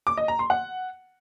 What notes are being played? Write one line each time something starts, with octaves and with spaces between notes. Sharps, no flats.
D6
D#5
A#5
C6
F#5